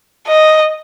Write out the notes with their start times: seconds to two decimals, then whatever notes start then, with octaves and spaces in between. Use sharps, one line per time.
0.28 D#5